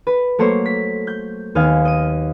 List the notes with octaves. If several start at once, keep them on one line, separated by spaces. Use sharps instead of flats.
B4
F#3 A3 A#3 C5 C#5
B6
G6
D#2 B3 D#5 F5 G#5 F6
D#5 D#7